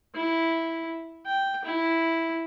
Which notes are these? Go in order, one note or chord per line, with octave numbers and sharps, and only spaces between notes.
E4
G5
E4